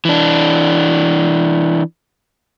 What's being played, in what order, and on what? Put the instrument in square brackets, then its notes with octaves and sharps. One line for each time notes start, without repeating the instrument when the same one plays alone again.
[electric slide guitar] E3 D4